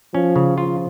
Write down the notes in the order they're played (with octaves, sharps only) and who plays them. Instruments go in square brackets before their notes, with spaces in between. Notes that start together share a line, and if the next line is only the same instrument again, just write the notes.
[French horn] F3 [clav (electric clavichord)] C#4
[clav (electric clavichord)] C#3
[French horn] F3 [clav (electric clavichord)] F4